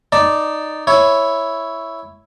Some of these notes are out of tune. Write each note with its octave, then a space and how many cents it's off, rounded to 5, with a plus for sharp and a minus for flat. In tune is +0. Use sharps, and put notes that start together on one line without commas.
D#4 -5 D5 +0 A5 +0
E4 +0 C#5 +0